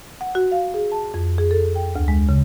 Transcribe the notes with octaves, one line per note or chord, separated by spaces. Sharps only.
F#5
F#4
F5
G#4
A5
F2
G#4
A4
G5
D2
G#3
C#3